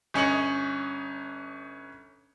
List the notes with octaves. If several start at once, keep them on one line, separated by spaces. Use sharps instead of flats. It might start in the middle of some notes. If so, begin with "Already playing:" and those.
G1 C#4 D#5 C#7 F#7